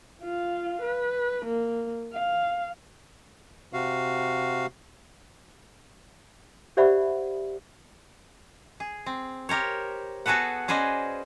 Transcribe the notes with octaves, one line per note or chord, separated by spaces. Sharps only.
F4 F5
B4
A#3
F5
C3 F#4 F5
G4 C5 D5 E5 F#5 B5
G#4
C4
G4 A#4 C5 C#5
B3 F#4 G#4 A4 B4 F#5
C#4 G#4 B4 C5 D5 D#5